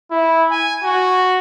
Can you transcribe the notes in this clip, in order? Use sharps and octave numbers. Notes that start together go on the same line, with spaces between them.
E4
G#5
F#4